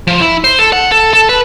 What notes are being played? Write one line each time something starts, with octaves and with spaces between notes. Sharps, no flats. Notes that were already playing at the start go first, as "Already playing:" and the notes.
F3
E4
C5
A4
F#5
A4
A4
B4